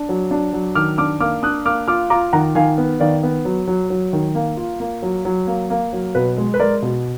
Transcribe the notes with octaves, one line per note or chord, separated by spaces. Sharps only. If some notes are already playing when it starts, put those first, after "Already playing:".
Already playing: D4
F#3
D4
F#3
D#3 D6 F6
D4 D6 F6
A#3 D6 F6
D4 D#6 F#6
A#3 D6 F6
F4 D6 F6
F4 A#5 D6
D#3 F#5 A#5
D#3 F5 G#5
B3
D#3 D5 F5
B3
F#3
F#3
F#3
D#3
A#3
F4
A#3
F#3
F#3
A#3
A#3
F#3
B2 B4
G#3
B4
G#3 A#4 D5
B2